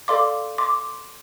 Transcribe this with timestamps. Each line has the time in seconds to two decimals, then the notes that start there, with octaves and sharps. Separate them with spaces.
0.08 A4 D5 F5 C6 D6
0.58 C6 D6